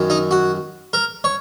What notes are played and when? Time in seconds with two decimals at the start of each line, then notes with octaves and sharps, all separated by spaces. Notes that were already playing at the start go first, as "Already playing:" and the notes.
Already playing: F#2 D#3 F#3
0.10 D#4
0.31 F#4
0.93 A#4
1.24 C#5